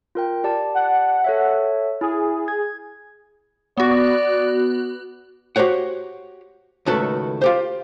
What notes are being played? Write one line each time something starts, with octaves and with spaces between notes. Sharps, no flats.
F4 A#4 G5
G4 D5 A5
F#5
A4 C#5 E5
E4 G#4
G#6
B3 F#4 D5
F#4 G4 C5 C#5 F#5
C#2 A2 D#3 F#4 A4 B4
F4 G4 C5